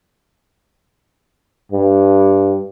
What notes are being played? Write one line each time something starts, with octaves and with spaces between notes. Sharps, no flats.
G2